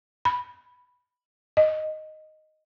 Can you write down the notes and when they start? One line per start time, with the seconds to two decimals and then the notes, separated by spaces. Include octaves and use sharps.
0.25 B5
1.57 D#5